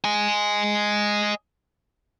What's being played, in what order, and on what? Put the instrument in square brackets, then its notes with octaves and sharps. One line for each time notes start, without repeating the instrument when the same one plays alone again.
[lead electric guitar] D#5 G#5